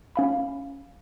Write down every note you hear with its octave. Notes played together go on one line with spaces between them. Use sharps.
C#4 F5 B5